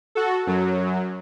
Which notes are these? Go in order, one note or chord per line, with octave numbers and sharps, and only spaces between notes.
F#4 A4
F#2 F#3